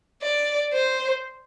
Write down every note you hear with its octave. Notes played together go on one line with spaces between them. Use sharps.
D5
C5